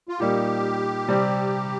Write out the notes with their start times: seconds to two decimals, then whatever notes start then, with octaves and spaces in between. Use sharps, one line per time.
0.09 F4
0.19 A#2 G3 A#3 D#4 G4
1.08 C3 G3 C4